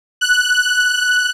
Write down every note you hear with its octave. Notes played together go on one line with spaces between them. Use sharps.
F#6